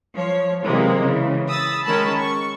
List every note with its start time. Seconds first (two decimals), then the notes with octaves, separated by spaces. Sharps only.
0.15 F3 C#5
0.63 C3 E3 F#3 G#3 A#3
1.05 C#3 E3
1.49 B5 D#6 E6 A6
1.85 D#3 G#3 C#4 A#4 A5 B5
2.19 C#6